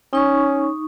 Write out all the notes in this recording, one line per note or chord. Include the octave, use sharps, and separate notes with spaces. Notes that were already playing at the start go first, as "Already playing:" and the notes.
C#4 D#4 C#6